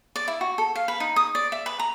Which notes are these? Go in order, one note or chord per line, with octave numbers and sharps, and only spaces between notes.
D5
E4
F#4
A4
F5
B4
D#4
D#6
D5
E5
B4
A#5